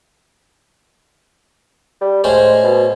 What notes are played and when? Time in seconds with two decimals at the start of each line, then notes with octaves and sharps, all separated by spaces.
2.01 G3
2.24 A2 G#3 C#4 C5
2.64 B2